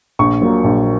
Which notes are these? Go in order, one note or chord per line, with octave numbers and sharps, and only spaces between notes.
A#1 C#6
A#2 F#3 A#3
A#1